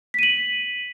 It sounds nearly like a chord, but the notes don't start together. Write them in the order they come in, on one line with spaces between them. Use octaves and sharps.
B6 D#7 F#7